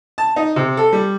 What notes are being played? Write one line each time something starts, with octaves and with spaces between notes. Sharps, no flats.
A5
D#4
C3
A4
G3